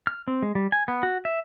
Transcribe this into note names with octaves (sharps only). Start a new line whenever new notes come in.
F6
C4
G#3
G3
G#5
B3
F#4
E5